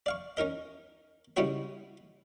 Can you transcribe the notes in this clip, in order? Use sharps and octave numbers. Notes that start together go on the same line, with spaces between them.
D5 F5 C#6
C#4 D#4 A#4 D#5
C#3 G3 D#4 E4 F#4 C#5